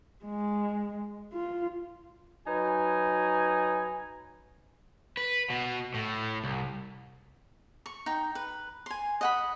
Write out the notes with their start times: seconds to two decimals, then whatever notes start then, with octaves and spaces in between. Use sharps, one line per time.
0.25 G#3
1.33 F4
2.47 F#3 D#4 B4 G#5
5.17 B4
5.50 B2
5.94 A2
6.44 C2
7.86 C#6
8.06 D#4 G5
8.35 B4
8.86 G#5 C6
9.21 D#5 F#5 B5